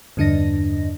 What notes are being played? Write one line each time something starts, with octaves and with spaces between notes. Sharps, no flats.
E2 G2 D3 D4 D#5 A#6